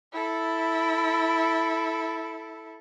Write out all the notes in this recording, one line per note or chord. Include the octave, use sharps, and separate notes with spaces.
E4 A4